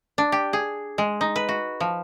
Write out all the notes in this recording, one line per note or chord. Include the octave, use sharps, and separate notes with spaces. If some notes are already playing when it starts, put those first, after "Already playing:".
D4
G4
G#4
G#3
D#4
B4
F#4
F3